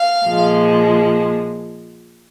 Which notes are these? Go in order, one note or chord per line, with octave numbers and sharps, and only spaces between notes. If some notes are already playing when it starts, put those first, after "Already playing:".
Already playing: F5
A#2 F3 G#3